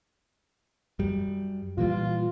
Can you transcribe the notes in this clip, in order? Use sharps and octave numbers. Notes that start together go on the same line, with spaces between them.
F#2 G3
A#2 E3 G3 F4